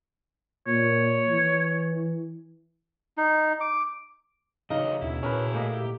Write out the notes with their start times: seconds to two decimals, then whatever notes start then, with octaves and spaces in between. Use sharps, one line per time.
0.67 A#2 C#5
1.29 E3
3.17 D#4
3.61 D6
4.70 C#3 E3 F#3 C#4 D#4 D#5 F5
5.01 D#2 B2 D4 E4
5.23 A#2 C#4 F#4 G#4 A#4 B4 G#5
5.54 A2 A#3 D#5
5.74 G4